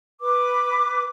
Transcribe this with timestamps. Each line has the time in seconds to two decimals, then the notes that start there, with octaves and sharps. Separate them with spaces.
0.22 B4 D6